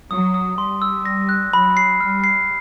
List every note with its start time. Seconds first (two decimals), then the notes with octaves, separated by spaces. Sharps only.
0.11 F#3 D#6
0.34 D#6
0.58 G3 C6
0.82 E6
1.05 A#6
1.29 F#6
1.53 F#3 B5
1.77 C7
2.00 G3 F6
2.24 C7